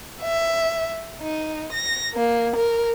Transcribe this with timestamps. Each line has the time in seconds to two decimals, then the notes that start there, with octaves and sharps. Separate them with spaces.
0.21 E5
1.20 D#4
1.71 A#6
2.13 A#3
2.56 A#4